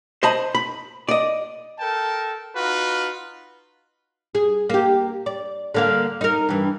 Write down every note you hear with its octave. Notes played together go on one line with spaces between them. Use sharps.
C5 D#5 A5 B5
B5
D5 D#5
A4 A#4 G5 A5
D#4 F4 F#4 B4
G#4
A#3 G4
D5
D3 A#3 F5
D#4 A#4
G2 E3